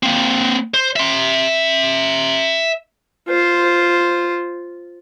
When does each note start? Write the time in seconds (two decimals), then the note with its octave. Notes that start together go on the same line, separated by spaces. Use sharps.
0.03 A#3 C4
0.74 C5
0.96 E5 C6
3.29 F4 C5